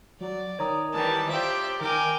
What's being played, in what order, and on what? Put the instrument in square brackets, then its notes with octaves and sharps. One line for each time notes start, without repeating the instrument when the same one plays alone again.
[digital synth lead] F#3 [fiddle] D5
[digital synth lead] D#3 [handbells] C#5 A#5 D#6
[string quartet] E3 G3 [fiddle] A5
[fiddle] F4 E5 [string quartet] G4 D5 G5 [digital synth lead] C5
[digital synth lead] D#3 [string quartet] A#4 G5 [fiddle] G#5 D6